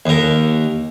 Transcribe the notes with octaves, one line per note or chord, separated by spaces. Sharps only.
D#2 A#4